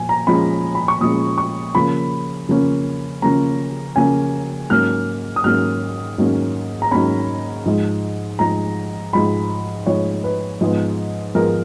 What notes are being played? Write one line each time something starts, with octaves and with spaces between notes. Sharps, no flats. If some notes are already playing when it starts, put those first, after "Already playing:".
Already playing: A#2 F3 G#5
A#5
A#2 F3 G#3 C#4 B5
B5
C#6
A#2 F3 G#3 C#4 D#6
C#6
C#3 F3 A#3 C#4 B5
C#3 F3 A#3 C#4
C#3 F3 A#3 C#4 A#5
C#3 F3 A#3 C#4 G#5
G#2 F#3 A#3 C#4 F6
D#6
G#2 F#3 A#3 C#4 F6
G#2 F#3 A#3 C#4
A#5
G#2 F#3 A#3 C#4 B5
G#2 F3 G#3
G#2 F3 G#3 A#5
G#2 F3 G#3 B5
G#2 F3 G#3 C#5
B4
G#2 F3 G#3 B3
G#2 F3 G#3 B3 A#4